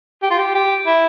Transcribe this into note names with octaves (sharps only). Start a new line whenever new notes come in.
G4
F4
G4
G4
E4